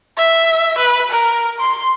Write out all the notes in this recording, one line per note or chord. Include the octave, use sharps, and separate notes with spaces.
E5
B4
A#4
C6